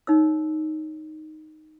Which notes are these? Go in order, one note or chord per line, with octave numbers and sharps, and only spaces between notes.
D#4 C#5 E6